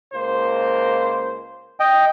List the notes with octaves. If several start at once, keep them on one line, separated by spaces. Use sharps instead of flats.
C#2 A#3 C5
D#5 G5